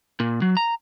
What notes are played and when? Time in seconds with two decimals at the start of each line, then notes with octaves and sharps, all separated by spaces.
0.20 A#2
0.42 F#3
0.57 A#5